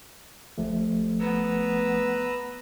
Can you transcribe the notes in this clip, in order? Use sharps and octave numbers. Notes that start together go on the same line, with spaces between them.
G1 F3 A3
B3 B4 A#5 E6